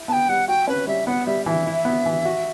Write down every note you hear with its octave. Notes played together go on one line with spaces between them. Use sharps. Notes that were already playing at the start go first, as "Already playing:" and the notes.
Already playing: E4
B3 G5 A5
G3 F#5
F#4 G5
C#4 B4
G3 E5
B3 F#5
G3 E5
E3 E5
E4
B3
E3
F#4